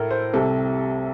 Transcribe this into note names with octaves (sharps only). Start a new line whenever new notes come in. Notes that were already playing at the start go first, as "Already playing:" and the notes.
Already playing: A2 A4 A#4
C5
C2 C3 G3 A4